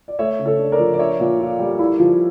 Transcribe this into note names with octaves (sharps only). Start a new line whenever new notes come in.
D5
A3 C#5 E5
C#3
A4 C#5
D4
A#4 D5
F3
D5
D4 C#5 E5
A#2
F4
G3
E4
F3